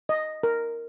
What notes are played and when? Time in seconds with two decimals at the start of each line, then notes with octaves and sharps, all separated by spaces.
0.09 D#5
0.43 A#4